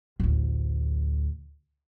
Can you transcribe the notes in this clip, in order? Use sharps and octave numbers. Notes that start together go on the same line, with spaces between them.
A1 D2